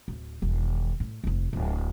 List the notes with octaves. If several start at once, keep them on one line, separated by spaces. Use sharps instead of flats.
D1
E1 D#3
A2
F1 D#2
D1 D#2